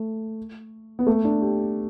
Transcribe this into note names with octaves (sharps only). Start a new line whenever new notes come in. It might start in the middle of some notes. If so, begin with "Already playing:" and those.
Already playing: A3
B3
A3
D4
G4